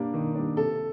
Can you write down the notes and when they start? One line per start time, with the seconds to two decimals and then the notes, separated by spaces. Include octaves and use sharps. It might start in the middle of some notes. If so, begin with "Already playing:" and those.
Already playing: G3 A#3 D4
0.14 D#3
0.35 G3 A#3 D4
0.57 C3 A4